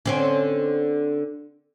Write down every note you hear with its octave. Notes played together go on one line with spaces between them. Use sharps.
D3 C4 C#4